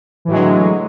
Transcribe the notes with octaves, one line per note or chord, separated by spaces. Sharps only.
A2 D3 E3 F#3 G#3